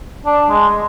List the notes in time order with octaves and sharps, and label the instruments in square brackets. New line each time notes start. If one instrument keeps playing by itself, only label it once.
[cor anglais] D4
G#3